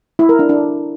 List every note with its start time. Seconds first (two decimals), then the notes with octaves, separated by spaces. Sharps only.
0.19 E4
0.29 A#4
0.39 D4
0.49 D4